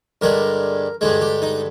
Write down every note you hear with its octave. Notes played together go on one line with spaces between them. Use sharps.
G2 D3 G#3 A#4
G2 D3 G#3 G#4
G4
D#4